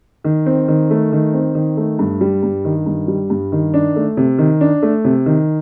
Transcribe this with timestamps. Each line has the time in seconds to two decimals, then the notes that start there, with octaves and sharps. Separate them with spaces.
0.24 D#3
0.46 C4
0.68 D#3
0.90 A3
1.12 D#3
1.34 C4
1.55 D#3
1.77 A3
1.99 G2
2.21 G3
2.43 G2
2.65 D#3
2.86 G2
3.08 G3
3.30 G2
3.52 D#3
3.74 D4
3.96 A3
4.17 C3
4.38 D#3
4.61 D4
4.82 A3
5.05 C3
5.26 D#3